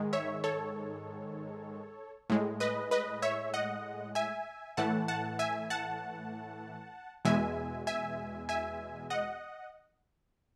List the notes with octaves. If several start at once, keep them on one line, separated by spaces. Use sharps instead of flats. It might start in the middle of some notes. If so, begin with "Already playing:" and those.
Already playing: G#2 D#3 G#3
C#5 E5
A4 C#5
A2 G#3
B4 D#5
B4 D#5
C#5 E5
D#5 F#5
E5 G#5
A2 E3 A3 F#5 A5
F#5 A5
E5 G#5
F#5 A5
E2 B2 G#3 E5 G#5
E5 G#5
E5 G#5
D#5 F#5